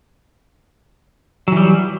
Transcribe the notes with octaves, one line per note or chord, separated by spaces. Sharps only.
E3 F#3 G3